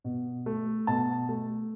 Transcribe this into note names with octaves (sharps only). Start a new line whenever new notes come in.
B2
A3
B2 A5
A3